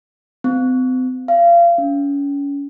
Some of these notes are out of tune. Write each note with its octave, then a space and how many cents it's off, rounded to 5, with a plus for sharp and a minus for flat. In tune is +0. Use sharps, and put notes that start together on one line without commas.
C4 -40
F5 -30
C#4 +30